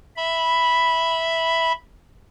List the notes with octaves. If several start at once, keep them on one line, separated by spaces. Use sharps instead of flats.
E5 B5